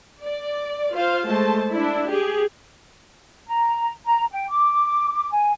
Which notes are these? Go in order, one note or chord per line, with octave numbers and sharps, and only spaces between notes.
D5
F4 C5 F5
G#3 A3 C5 A5
D4 E4
G4 G#4
A#5
A#5
G5
D6
G#5